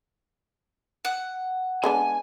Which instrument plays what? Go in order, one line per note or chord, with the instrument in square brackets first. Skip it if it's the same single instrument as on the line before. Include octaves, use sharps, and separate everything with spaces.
[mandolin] F#5
[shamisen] G#3 B3 D4 [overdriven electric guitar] G#5